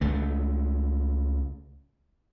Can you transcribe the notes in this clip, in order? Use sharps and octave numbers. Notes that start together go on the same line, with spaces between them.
C#2 A3